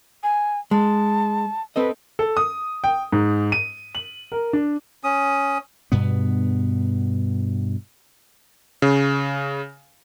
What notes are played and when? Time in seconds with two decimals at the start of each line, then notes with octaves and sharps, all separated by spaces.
0.23 G#5
0.71 G#3 A5
1.76 C4 A4 B4 D#5
2.19 A4
2.37 D#6
2.84 G5
3.13 G#2
3.52 D#7
3.95 F#7
4.32 A#4
4.53 D4
5.04 C#4 D#6
5.92 G2 B2 B3
8.82 C#3